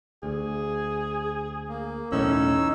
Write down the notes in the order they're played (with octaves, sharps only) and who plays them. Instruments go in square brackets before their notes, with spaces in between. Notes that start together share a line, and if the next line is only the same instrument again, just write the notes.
[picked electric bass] D2 [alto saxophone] G#4
[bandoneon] A#3
[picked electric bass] B1 E2 A2 [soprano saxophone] C#4 [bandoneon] D#4 E6